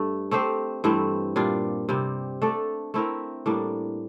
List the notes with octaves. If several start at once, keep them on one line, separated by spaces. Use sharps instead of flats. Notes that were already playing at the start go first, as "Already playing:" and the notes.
Already playing: G2 A3
A3 C4 G4 C5
G2 E3 A3 C4
A#2 G3 D4 F4
C3 G3 C4
A3 D4 A4 D5
A3 C4 E4 A#4
A2 G3 A#3 D4